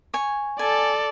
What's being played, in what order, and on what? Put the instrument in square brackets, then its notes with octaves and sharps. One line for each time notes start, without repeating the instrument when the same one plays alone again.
[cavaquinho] C#5 G#5
[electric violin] A4 D5 [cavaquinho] G#5